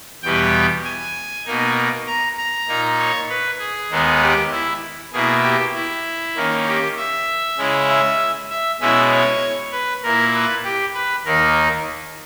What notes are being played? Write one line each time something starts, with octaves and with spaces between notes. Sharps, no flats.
E2 B2 G3 B3 G5
G#5
B2 A#3 D#4
A#5
A#5
A#2 A#3 D#4
C#5
B4
G#4
D#2 D#3 G#3 B3
G4
E4
B2 A#3 E4 G#4
G4
E4
D#3 A#3 C#4
G4
E5
C#3 G#3 C#4 E4
E5
E5
B2 G#3 C#4 E4 E5
C#5
B4
A#2 A#3 E4 A#4
B4
G4
B4
D#2 D#3 A#3 D#4 A#4